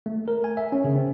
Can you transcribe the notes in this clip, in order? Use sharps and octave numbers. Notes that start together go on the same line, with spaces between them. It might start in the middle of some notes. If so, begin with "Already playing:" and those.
A3
A#4
G#5
E5
C#4
C#3
C4